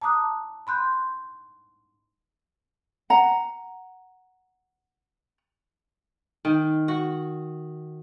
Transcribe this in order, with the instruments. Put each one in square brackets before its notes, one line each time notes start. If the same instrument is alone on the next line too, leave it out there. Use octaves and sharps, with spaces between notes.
[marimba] A5 A#5 D6 D#6 F#6
B5 C6 F#6 G6
[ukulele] F#5 A#5
[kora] D#3
F#4